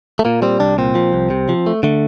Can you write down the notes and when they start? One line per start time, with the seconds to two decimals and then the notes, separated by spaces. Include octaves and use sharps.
0.19 A3
0.25 A#2 A#3
0.42 G3 C4
0.60 C2 D4
0.78 A#2 C4
0.95 F3
1.13 C2
1.30 C3
1.49 F3
1.66 A3
1.83 D3 A3